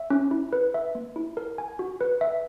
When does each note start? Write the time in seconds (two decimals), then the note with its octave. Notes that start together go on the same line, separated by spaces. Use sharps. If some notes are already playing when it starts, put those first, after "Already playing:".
Already playing: E5
0.10 C#4
0.31 E4
0.53 B4
0.74 E5
0.95 A#3
1.16 E4
1.37 A#4
1.58 G#5
1.79 F#4
2.01 B4
2.21 E5